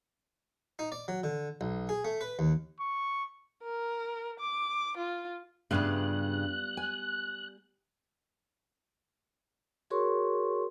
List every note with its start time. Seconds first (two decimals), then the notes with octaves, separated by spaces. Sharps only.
0.79 D#4
0.92 D5
1.08 F#3
1.24 D3
1.61 B1
1.89 G#4
2.05 A3
2.21 B4
2.39 D#2
2.81 C#6
3.63 A#4
4.40 D6
4.97 F4
5.71 G2 C#3 G3 B3 F4 F#6
6.77 G#5
9.90 F#4 G#4 A#4 C#5 C6 C#6